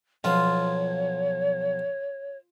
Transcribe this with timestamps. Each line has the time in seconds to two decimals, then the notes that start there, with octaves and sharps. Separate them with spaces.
0.24 B1 F3 B3 F4 C#5